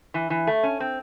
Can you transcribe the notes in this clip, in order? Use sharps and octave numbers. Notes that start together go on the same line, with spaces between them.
E3
E3
A3
C#4
C4